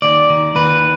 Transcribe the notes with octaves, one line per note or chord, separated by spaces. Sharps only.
D#2 D5
D#3
D#2 B4